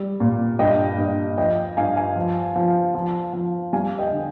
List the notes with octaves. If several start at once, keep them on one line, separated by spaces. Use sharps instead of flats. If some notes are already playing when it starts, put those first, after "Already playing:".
Already playing: G3
A#2
G2 D#5 G5
G2
F3 D#5 G5
G2 F5 G#5
F5 G#5
F3
F3
F3
F3
G3 F5 G#5
D#5 G5
D3